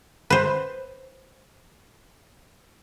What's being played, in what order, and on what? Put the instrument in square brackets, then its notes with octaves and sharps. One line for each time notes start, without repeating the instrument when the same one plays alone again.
[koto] B4 C5